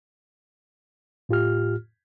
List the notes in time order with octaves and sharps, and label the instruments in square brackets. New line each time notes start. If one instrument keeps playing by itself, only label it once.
[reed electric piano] A2 F4 G4 F6